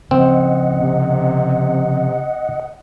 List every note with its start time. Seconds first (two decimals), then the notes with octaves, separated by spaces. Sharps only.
0.11 C#3 F3 C4 D#5 F#5
0.81 C3